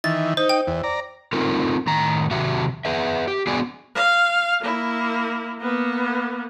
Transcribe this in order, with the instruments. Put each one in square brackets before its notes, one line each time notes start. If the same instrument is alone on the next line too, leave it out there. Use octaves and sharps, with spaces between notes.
[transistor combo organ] D#3 E3 [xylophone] A6
[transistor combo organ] D#4 [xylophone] C5
[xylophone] G5
[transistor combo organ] E2
D5 A#5
[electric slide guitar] A3 C4 D#4 F4 A#4
A2 D#3 A#5
C3 D#3 F#3 F#4 E5
G#4 B4 E5
G4
B3 F#4 G#4 D5 G#5
[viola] F5
A#3 E4
A#3 B3